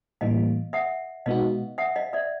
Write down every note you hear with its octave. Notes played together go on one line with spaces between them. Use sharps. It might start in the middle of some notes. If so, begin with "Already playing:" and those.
A2 E3 G3 A#3 D#5 F5
E5 F#5
B2 G#3 B3 D#4 F#4 D#5 F5
E5 F#5
D#5 F5
D5 E5